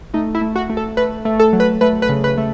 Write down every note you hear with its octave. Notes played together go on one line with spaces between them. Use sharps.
A3 D#4
E4
A3
F#4
A3
A4
A3 B4
A3
A4
F#3
B4
A3 B4
B4
C#3
B4
A3